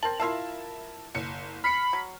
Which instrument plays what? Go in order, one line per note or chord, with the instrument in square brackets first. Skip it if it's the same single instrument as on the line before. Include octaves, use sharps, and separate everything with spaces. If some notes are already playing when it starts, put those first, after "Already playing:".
[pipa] C4 A5 [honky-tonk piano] A#4 F#7
[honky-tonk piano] E4 A#4 A5 [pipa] F4 E5 F5
[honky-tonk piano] F#1 C#7
[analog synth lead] B5 [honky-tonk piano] F6 C7 C#7
[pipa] F#3